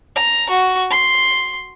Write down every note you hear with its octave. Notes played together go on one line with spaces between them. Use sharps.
A#5
F#4
C6